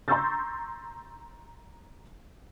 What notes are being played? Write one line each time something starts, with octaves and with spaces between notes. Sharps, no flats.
A#5 C6 C#6 E6 G6 A6